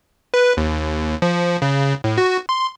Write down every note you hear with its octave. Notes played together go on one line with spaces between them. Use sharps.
B4
D#2
F3
C#3
A2
F#4
C6